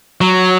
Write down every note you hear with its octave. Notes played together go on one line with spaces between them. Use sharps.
F#3